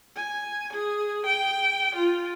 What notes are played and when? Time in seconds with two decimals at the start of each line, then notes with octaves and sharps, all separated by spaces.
0.17 G#5
0.73 G#4
1.26 G5
1.95 F4